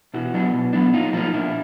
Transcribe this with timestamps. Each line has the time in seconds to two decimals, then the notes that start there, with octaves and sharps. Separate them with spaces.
0.14 B2 E4 F#4
0.34 F#3 B3 D4
0.54 B2
0.73 F#3 B3 D4
0.94 A#2 D#4 F4
1.13 F3 A#3 D#4 F4
1.33 A#2 D4 E4